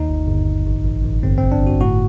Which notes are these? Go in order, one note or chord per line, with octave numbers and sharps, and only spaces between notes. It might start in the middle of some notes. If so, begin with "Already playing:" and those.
Already playing: D#2 D#4
G1
G1
G1
A1
A1
A1
G1 C4
C4
G1
D4
G1 F#4
A2 F#4